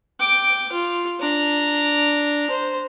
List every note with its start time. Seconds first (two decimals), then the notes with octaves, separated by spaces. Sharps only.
0.20 G5 D6
0.72 F4
1.20 D4 A#5
2.50 C5